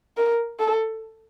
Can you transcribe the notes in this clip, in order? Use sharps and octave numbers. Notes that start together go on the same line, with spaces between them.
A#4
A4